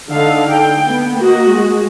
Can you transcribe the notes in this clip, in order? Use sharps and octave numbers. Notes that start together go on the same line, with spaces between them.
D3 D#4 A4 F5
G5
B3
A#3 F#4 D#5
G#3